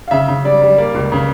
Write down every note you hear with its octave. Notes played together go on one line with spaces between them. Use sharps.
F5
C#3 E5
C#3
G3 D5
G3
A#3 D5
C#2
C#3